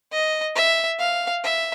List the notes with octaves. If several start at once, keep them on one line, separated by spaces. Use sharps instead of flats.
D#5
E5
F5
E5